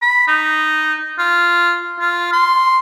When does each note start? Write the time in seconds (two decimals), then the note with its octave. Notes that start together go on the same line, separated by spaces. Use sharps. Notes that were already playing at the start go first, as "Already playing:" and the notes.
0.02 B5
0.28 D#4
1.19 F4
2.00 F4
2.32 C6